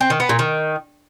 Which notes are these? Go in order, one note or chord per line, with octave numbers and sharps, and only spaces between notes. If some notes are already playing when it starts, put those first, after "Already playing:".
C4
D#3
B3
A#2
D#3